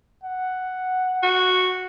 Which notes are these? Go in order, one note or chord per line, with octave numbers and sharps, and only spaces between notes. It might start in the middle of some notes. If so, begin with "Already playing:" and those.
F#5
F#4